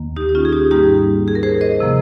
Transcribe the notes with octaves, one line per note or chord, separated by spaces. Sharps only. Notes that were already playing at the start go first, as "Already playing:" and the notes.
Already playing: D#2 D#3 A#3
D#4 G4
D#4
C#4 F4
G#4
D#4 G4
G#2 G3 A#3 D#4 G4
G#4
A#4
G#4 C5
C5 D#5
C3 F3 A#3